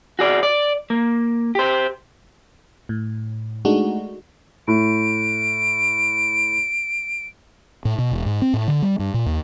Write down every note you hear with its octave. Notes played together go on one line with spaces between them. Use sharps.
F#4 G#4 D5
D5
A#3
G4 C5
A2
G#3 A3 D4 D#4 F#4
A2 D7
A2
B2
E1
G#2
C4
A2
D3
G3
G2
A#2
D#2